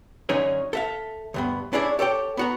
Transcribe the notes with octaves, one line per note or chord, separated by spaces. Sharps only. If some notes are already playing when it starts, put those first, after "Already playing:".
F#2 D3 C#4 D#4 G#4 C#5
A4 E5 F5
D2 G2 B3
C#4 D4 E4 G#4 D5
G4 A4 C#5 G5
B3 F#4 A#5